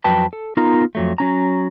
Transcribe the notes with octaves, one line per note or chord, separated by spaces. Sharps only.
F2 F#3 B4 G5 A5
A4
B3 D#4 F4 A#4 A#5
F2 F#3 A3
F#3 C#4 A#5